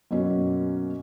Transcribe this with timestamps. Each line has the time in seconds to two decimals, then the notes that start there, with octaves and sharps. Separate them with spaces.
0.11 F#2 B2 A#3 C#4